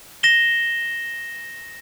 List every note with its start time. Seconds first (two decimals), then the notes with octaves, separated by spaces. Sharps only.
0.23 A#6 E7 G7